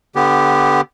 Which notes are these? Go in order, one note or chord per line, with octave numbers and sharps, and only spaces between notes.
D3 B3 G4